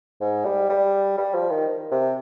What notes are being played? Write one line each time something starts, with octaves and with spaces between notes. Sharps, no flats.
G#2
G3
G3
G3
F3
D#3
C3